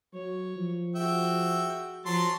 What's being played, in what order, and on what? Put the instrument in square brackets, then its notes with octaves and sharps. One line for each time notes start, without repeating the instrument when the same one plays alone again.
[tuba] F#3 [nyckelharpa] C#5
[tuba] F3
[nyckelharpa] F#4 G#4 [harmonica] E5 G5
[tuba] F3 [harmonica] F#3 C6 [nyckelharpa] A5